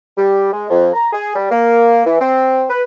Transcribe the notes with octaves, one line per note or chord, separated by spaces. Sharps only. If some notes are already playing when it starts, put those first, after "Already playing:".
G3
G#3
F2
A#5
G#4
G3
A#3
E3
C4
B4